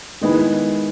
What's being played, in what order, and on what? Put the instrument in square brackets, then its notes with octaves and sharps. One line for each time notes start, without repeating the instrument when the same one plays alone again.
[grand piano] D#3 G#3 B3 E4